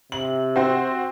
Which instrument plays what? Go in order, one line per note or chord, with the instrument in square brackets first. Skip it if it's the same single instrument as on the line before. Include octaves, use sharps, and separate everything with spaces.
[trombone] C3 [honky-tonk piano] F#7
[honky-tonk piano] C4 F#4 C5